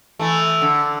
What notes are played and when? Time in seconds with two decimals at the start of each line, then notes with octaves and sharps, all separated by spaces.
0.19 E3 A3
0.62 D3